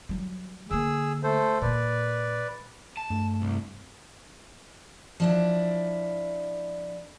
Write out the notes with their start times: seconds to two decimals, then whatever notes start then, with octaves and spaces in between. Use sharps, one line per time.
0.09 F#3 G3
0.71 D3 A#3 G#4 E6
1.23 A3 A4 C5
1.62 A#2 A#3 B4 D5
2.97 A5
3.10 G2 A3
3.42 C2
5.20 F3 D4 E4